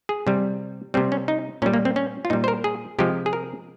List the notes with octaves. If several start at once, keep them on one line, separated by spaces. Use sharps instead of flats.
G#4
C3 G3
C3 G3 C4
C#4
D#4
A#2 G3 C#4
A#3
C4
C#4
F4
A#2 G3 D#4
C5
A#4
G#4
C3 F3 G#3 G4
G#4
A#4